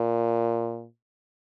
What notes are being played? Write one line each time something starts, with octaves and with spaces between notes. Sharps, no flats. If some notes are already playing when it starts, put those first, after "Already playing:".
Already playing: A#2